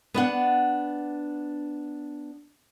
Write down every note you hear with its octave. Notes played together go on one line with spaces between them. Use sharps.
B3 D4 F#5